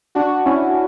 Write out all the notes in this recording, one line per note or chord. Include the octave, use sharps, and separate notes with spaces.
D4 F#4
C#4 E4